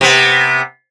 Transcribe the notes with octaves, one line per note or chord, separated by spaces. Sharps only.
C3 B3